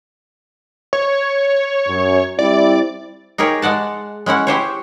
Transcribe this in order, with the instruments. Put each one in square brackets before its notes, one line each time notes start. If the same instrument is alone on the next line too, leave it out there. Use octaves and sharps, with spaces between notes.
[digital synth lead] C#5
[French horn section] F#2
[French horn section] G3 C4 E4 [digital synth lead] D5
[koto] D#4 G4 G#4 A#4 C#5
G#3 D5 F#5 A5
G#3 C#4 E4 F#5
E4 G4 C5 C#5